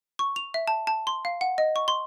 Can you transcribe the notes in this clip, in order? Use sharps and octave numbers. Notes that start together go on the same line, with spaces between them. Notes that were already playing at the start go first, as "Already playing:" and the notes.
C#6
F7
E5
A5
A5
C6
F5
F#5
D#5
C#6
C6